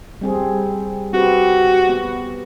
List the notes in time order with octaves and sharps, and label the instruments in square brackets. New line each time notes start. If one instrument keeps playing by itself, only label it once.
[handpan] G3 C4 G#4
[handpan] C4 G4 B4 [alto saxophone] F#4
[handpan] B3